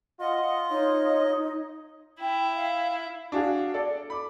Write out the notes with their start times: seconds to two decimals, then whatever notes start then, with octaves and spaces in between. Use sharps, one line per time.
0.21 F4 D#5 F#5
0.70 D#4 C#5
2.20 E4 G5
2.56 F5
3.32 D4 F#4 G#4 F5
3.74 A4 D5
4.10 B5 D6